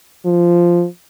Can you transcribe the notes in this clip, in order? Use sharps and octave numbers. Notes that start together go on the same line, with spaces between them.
F3